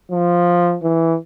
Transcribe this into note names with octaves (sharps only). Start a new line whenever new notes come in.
F3
E3